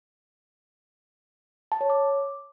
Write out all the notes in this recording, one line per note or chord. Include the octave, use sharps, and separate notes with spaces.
A5
C#5
D6